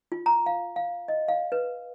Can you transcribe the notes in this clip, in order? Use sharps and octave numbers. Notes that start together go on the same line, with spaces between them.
F4
A#5
F5
F5
D#5
F5
B4